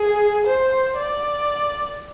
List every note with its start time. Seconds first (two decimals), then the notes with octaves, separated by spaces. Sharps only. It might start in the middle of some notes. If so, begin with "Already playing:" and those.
Already playing: G#4
0.47 C5
0.97 D5